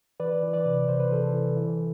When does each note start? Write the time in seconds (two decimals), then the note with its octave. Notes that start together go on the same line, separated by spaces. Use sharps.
0.20 E3 B4 D5
0.43 E3
0.53 B4 D5
0.66 C3
0.88 C3 C5
1.00 B4
1.10 E3 A4 C5
1.33 E3
1.57 E3